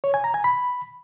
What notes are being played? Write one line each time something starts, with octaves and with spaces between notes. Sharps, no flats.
C#5
G#5
A#5
G#5
B5